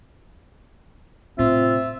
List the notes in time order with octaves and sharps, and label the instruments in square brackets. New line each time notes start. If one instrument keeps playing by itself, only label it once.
[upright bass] A2 C3 [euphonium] C4 [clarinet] F4 [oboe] E5